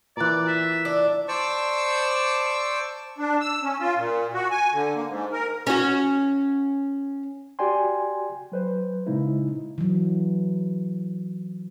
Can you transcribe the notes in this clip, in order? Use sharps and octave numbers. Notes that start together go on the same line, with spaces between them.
A#2 E3 D5 A#5 F#6
E5
D4
C5 D5 A5 C#6 D6 E6
D4
E6
C#4
F4
A#2
F#4
G#5
D3
A#3
G#2
A#4
C#4 F#4
F#4 G4 D5 G5 G#5 C6
F#3 B4 C5
A#2 C#3 G#3 D#4 E4
E3 F#3